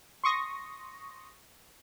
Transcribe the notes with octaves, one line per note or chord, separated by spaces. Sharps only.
C6 C#6 D#6 A#6